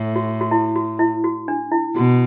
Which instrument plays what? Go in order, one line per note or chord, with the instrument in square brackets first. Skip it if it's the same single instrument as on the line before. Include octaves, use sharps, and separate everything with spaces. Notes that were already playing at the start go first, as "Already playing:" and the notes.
Already playing: [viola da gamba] A2
[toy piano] F#4
F#4
E4
F#4
E4
F#4
D4
E4
[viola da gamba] B2 [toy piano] F#4